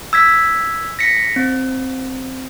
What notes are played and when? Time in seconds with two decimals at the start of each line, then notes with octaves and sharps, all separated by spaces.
0.13 E6 G#6 B6
0.99 A#6 B6 C#7
1.36 C4